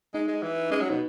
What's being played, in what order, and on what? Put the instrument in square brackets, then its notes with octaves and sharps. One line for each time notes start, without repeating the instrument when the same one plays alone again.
[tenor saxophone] G#3 [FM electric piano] D#4
[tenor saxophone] G#3
E3
[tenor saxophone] G#3 [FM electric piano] C#4
[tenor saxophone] F#3
[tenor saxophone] B2 [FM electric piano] D#4